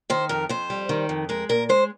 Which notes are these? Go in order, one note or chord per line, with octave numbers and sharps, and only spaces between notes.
D#3 C5
F2 A#4
F2 C5
G3
D#3
F2
G#3 A#4
A#2 A#4
G#3 C5